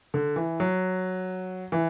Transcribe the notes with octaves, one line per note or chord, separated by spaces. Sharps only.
D3
E3
F#3
E3